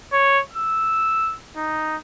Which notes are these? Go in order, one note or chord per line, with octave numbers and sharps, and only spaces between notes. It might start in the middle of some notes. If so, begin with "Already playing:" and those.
C#5
E6
D#4